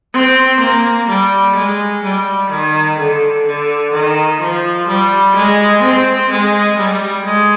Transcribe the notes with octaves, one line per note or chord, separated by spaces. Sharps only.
C4
A#3
G3
G#3
G3
D#3
D3
D3
D#3
F3
G3
G#3
C4
G#3
G3
G#3